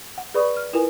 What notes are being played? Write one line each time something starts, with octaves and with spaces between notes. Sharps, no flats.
F#5
G#4 B4 D5 B5 C#6 D#6
F6
E4 F4 A#4 B4 G#5